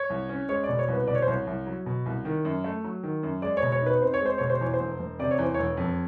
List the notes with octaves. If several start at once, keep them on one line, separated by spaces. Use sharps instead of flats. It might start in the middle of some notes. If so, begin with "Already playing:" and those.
Already playing: C#5
C2
C#4
G#3 C#5
D5
B2
C#5
C2 B4
B2 D5
C#5
C5
C2 C#5
C2
F#3
B2
C2
D#3
F#2
A3
F#3
D#3
F#2
G#3 D5
C#5
B2
C#5
D#4 B4
C4 C5
C#5
G#3 C5
B2 C#5
C5
E2 C#5
C5
E1
E1
C3 D5
C#5
E2 C5
E1 C#5
F2